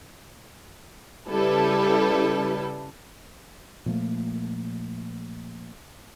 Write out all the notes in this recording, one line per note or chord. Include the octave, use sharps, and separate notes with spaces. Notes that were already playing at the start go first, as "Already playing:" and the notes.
C#3 G3 E4 A4 B4
A#2 F3 A3 A#3